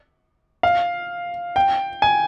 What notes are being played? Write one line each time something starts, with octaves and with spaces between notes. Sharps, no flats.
F5
G5
G#5